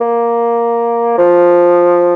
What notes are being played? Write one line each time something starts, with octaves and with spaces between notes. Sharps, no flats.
A#3
F3